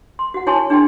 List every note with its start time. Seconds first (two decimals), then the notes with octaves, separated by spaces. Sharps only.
0.19 C6
0.34 F#4 F#5
0.47 E4 C#5 G#5 A5 C6 C#6
0.70 D4 G#4 D#5 G5 G#5 C6